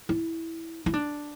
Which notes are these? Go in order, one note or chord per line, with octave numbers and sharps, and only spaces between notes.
E4
E4
D4